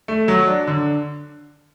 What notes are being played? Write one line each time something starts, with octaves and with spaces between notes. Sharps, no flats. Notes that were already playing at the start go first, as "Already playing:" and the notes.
A3
F#3
D4
D3